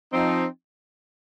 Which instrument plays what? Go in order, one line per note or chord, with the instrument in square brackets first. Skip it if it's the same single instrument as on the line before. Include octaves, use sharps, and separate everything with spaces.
[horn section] F3 C4 D#4